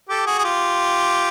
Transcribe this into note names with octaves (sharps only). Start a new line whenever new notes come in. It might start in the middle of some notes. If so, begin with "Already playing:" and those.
G4 A4
F#4 G#4
G#4
F4 G4